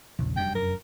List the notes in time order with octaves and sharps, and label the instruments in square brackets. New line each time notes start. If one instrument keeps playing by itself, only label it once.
[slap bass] A#1 [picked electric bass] E2 C#3 E3
[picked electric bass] F1 D4 [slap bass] F#2 G3 [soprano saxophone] G5
[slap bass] F#2 [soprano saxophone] A#4